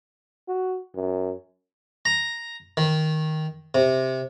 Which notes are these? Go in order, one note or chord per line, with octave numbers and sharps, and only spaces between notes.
F#4
F#2
A#5
D#3
C3